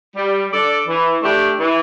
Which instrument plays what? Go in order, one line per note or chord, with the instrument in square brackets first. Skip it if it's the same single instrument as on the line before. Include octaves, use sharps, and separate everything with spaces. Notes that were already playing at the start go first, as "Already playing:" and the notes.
[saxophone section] G3
D4 A4 D5
E3
A3 D4 G4
E3